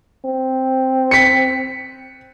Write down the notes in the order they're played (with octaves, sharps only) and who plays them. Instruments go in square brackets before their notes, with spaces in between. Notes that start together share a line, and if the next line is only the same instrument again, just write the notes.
[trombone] C4
[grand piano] B6 C#7